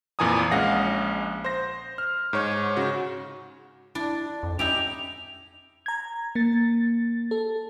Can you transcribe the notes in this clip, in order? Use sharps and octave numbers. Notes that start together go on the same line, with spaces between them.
F2 A#2 E3 G#5 A#5 D#6
A#1 G#3 C#4 F5 F#5 A#6
C5 A#6
F6
G#2 C#5
C#3 F#4
D4 E4
F2
C#4 D#4 E4 G4 F7
A#5 G#6
A#3 A6
A4